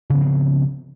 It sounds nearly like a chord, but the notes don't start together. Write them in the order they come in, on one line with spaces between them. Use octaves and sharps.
C#3 B3 F3 C4